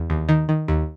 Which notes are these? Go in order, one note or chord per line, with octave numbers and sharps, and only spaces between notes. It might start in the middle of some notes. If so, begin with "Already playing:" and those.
Already playing: E2
D#2
D#3
D#3
D#2